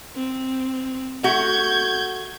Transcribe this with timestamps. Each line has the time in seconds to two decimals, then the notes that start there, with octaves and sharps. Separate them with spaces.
0.16 C4
1.24 A3 F#4 G6 G#6